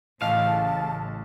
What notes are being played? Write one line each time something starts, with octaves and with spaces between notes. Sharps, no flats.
A1 A2 C#3 D#5 F5 A5 F6